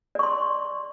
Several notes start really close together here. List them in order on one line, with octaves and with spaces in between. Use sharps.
D5 C#6 C6